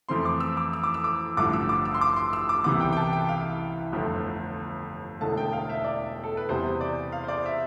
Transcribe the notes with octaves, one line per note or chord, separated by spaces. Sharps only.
F2 E3 A3 C4 C6
D6
E6
D6
E6
D6
E6
D6
A1 G2 D3 F3 A3 D6
E6
D6
E6
C6
D6
C6
E6
D6
C2 C3 E3 B3 D6
G5
G5
A5
G5
F5
G1 F2 D3 A3
E1 E2 D3 A3 A5
G5
F5
E5
D5
A4
B4
E2 C3 G3 B3 C5
D5
F5
C5
D5
E5